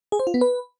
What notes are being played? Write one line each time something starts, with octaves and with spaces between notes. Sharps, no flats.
G#4
C5
F4
B3
B4